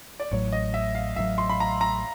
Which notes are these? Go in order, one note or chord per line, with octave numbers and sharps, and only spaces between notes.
D5
A1 A2 F#3 C#5
D#5
E5
F5
A1 A2 F#3 E5
C6
B5
A#5
A#5